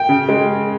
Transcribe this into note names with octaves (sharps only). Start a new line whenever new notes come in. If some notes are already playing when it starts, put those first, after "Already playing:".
Already playing: G5
C#3
G#3